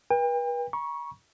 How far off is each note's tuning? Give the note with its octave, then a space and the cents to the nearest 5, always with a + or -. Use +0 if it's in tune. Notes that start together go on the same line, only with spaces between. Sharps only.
B4 -35 G5 +40
A#5 +45 C#6 +0